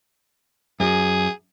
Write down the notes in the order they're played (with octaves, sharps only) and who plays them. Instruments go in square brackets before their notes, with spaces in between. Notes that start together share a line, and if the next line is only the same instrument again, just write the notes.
[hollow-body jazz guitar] F#2 [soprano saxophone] G#4